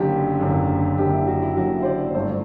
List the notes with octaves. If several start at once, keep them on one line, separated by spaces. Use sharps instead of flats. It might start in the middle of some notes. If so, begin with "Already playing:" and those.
Already playing: F#1 F#2 D3 G4
F#1 F#2 D3
F#1 F#2 D3 G4
E4
F#4
E4
F#1 F#2 D3 F#4
C5
D5
G1 G2 F#3 A3 C5